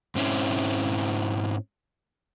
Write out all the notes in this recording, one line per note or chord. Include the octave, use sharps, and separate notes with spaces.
G#2 C4 C#4 E4